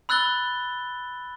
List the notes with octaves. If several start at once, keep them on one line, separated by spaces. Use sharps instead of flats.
B5 E6 F#6 A6 G7